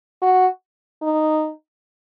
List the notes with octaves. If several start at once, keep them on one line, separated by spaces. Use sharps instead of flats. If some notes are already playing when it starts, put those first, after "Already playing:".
F#4
D#4